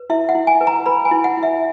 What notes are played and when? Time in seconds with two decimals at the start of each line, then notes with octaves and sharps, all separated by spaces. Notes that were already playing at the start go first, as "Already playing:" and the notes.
Already playing: B4
0.10 E4 E5
0.29 F#5
0.35 E4
0.47 G#5
0.61 B4
0.67 A#5
0.86 B4 B5
1.05 G#5
1.11 E4
1.24 F#5
1.37 E4
1.43 E5